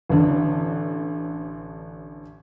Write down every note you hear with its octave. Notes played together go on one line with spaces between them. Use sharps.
A1 D3